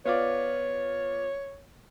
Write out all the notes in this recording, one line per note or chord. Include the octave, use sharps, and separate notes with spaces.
B3 F4 C#5 D5